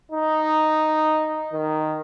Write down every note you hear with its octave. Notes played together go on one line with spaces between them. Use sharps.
D#4
D#3